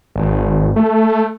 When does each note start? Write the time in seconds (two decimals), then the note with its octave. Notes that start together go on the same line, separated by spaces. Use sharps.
0.16 G#1
0.76 A3